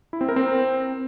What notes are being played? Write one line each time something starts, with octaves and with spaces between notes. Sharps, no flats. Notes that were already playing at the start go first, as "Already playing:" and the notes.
E4
C4
A#4
C4